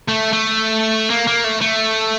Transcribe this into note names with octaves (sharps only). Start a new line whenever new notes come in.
A3
A3
A#3
A#3
A3
A3